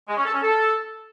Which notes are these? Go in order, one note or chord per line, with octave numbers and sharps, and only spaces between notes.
G#3
C#4
A4
C#4
A4